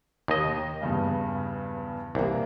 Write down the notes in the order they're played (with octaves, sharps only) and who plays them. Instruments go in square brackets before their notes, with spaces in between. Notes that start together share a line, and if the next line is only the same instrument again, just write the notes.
[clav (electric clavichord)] D#2 D#5
[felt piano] E2 G2 C#3
[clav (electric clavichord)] C2 [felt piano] E3 A#3